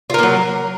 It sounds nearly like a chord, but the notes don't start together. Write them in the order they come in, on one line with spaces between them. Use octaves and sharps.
F4 A#4 A#3 F#3